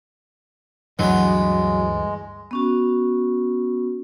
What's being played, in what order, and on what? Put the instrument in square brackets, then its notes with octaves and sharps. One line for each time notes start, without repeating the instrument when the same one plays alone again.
[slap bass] D2 G2 E3 [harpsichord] F#3 B3 [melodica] G#3
[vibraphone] B3 C#4 F#4